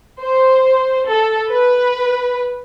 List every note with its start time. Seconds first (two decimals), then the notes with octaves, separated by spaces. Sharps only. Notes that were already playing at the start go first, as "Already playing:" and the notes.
0.21 C5
1.08 A4
1.50 B4